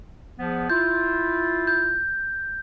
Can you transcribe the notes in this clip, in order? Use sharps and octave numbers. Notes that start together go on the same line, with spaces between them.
E2 F3 B3
E4 F4 G6
G6